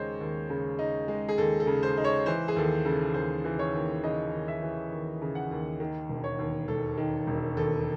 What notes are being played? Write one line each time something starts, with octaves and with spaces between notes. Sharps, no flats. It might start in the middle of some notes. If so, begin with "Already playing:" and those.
Already playing: D#2 C#3 G#3 D#4 C5 C#5
D#2
C#3
D#4
G#3
G#4
D#2 A4
A4
C#3
C5
D#4
C#5
E3 C5
G#4
D#2 A4
C#3 A4
D#2 C5
E3
C#5
D#2
C#3 D#5
D#2
E5
E3
D#2
C#3
F#5
D#2
D#3
E1
C#5
D#2
E1 A4
D#3
E1
D#2 A4